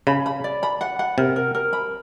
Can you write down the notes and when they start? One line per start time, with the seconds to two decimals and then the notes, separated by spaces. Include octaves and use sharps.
0.07 C#3 B5
0.26 B5
0.44 D5
0.63 B5
0.81 F#5
0.99 F#5
1.18 C3 A#4
1.36 A#4
1.55 A#4
1.73 B5